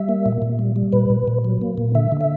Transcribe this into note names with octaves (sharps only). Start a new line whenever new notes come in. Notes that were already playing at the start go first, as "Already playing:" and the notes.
Already playing: G3 E5
A#3
A#2
A#2
G3
G3
A#2 B4
A#2
A#2
F#3
A#3
A#2
D3 E5
D3
E5